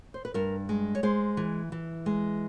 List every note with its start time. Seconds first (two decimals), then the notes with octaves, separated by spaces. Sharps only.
0.14 C5
0.25 B4
0.34 G2 A#4
0.69 G#3
0.95 C#5
1.03 G#3 C5
1.37 E3
1.72 E3
2.06 G#3